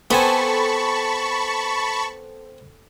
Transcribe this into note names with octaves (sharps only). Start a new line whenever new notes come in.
B3 C4 A4 G#5 A5 B5 C#6